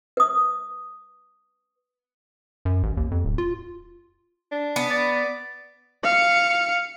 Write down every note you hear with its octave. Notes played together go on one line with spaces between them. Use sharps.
B4 D#6
F#2
A1
D#2
F2
D1
F4
D4
B3
D5
F5 C#7